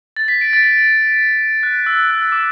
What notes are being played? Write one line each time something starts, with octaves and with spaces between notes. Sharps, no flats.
A6
B6
D7
A6
F#6
E6
F#6
E6
D6